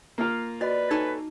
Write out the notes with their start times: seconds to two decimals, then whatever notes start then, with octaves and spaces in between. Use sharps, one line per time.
0.18 A#3 F4 A#4
0.61 F#4 B4 D5 D#5
0.91 D#4 A4 C#5 G#5